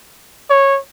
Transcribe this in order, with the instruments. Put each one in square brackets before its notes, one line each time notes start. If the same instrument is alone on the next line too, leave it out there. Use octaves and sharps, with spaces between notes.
[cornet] C#5